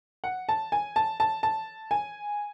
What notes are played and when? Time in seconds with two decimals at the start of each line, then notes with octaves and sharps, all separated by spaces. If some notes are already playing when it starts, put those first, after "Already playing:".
0.24 F#5
0.49 A5
0.72 G#5
0.96 A5
1.20 A5
1.43 A5
1.91 G#5